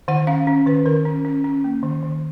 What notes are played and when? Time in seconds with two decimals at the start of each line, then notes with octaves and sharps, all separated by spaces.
0.08 D#3 F#5
0.27 C#4 F5
0.47 C#4
0.66 D#3 B4
0.86 D#3 A#4
1.05 C#4
1.25 C#4
1.44 C#4
1.64 A#3
1.83 D#3
2.03 D#3